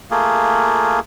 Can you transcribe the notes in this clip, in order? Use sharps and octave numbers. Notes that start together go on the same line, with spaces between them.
A3 A#3 F4 G#4